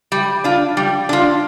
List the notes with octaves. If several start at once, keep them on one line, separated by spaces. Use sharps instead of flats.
G3
D4 F4
G3
D4 F4